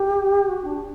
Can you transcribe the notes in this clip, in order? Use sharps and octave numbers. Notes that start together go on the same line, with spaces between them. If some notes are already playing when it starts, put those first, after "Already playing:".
Already playing: G4
F#4
D4